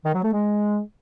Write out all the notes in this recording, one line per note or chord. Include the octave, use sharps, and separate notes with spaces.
D#3
F#3
A3
G#3